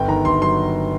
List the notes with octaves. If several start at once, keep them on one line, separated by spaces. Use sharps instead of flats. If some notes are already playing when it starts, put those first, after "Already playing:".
Already playing: G1 G5
D#3 A#5
G1 C6
F#3 C6